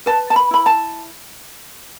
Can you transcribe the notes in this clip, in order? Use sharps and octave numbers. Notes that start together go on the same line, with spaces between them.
B4 A5
A5
B5
E4 B5
A5